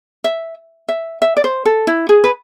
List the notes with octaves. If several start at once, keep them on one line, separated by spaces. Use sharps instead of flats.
E5
E5
E5
D5
C5
A4
E4
G#4
B4